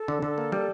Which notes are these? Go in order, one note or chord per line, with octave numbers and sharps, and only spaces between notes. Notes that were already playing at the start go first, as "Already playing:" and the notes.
Already playing: A4
D3
D3
A#3
G3